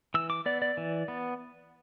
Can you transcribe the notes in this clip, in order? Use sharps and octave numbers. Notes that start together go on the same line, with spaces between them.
E3 E6
D6
B3 D5
D5
E3
B3